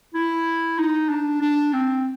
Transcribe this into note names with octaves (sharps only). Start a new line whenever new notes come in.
E4
D#4
D4
D4
C4